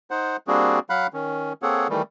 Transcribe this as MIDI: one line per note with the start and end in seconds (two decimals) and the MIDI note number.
0.11 0.37 63
0.11 0.37 72
0.11 0.37 78
0.48 0.79 55
0.48 0.79 58
0.48 0.79 60
0.48 0.79 62
0.48 0.79 66
0.48 0.79 68
0.90 1.07 54
0.90 1.07 77
0.90 1.07 78
0.90 1.07 83
0.90 1.07 90
1.13 1.53 51
1.13 1.53 61
1.62 1.87 58
1.62 1.87 60
1.62 1.87 68
1.62 1.87 69
1.62 1.87 73
1.62 1.87 78
1.90 2.02 51
1.90 2.02 52
1.90 2.02 55
1.90 2.02 57